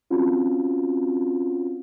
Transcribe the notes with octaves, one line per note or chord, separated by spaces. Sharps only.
C4 C#4 F4 F#4